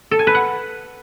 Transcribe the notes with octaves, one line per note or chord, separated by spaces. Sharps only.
A4
G#5
B4
F#5